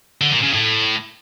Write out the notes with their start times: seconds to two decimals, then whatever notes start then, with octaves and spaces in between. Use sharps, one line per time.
0.21 D3
0.32 A#2
0.43 C#3
0.53 A2